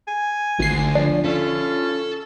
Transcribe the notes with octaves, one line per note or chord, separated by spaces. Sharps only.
G#5
G#1 D2 C7
F3 D4
C#4 E4 F4 A4